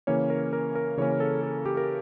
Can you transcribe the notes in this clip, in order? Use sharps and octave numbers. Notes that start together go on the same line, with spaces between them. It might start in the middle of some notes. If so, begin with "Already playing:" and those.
C#3 E3 A#3 C#4 C#5
A#4
A#4
A#4
C#3 E3 A#3 C#4 C#5
A4
A4
G4
A#4